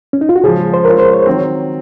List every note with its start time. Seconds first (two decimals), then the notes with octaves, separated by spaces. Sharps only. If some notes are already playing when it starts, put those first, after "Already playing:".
0.13 C#4
0.21 D#4
0.29 F4
0.36 F#4
0.44 C#3 F3 G#3 G#4
0.74 C5
0.85 G#3 C#4 F4 A#4
0.98 C5
1.13 C#5
1.26 D#3 F#3 C4